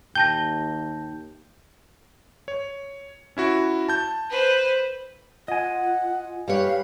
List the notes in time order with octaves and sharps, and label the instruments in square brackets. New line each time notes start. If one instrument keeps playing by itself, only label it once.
[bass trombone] D#2 [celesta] G5 A5 A#6 [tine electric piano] G6
[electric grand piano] C#5
C#4 E4 F#4
A5 G6
[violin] B4 C5
[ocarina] F4 [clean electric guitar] D#5 G#5 [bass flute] F#5
[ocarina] F4
[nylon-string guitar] G3 B4 C#5 [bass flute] G4 [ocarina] F5